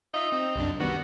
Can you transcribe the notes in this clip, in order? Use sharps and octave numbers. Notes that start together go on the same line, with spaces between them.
D#4 F4 E5
C4
C2 F#2 D4
D#3 G3 B3 F#4